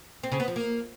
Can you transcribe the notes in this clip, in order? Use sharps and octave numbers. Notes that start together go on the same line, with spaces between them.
C4
C#3
B3
F3
A#3